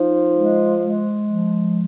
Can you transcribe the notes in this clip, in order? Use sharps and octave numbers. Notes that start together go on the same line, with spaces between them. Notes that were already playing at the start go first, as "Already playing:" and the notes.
Already playing: F3 D#4
G#3
G#3
F3